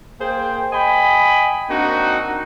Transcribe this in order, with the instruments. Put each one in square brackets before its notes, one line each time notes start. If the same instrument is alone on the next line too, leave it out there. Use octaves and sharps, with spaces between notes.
[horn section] A#3 G#4 C5 G5
D#5 G5 G#5 B5
A#3 C4 D4 D#4 F#4